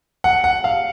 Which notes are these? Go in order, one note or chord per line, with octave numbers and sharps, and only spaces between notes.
F#5
F#5
F5